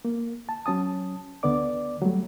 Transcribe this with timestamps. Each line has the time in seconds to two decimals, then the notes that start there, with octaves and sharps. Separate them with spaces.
0.05 A#3
0.49 A5
0.66 F#3 C#4 A5 D#6
1.43 D2 D3 B3 D5 D6
2.02 F#3 G3 A3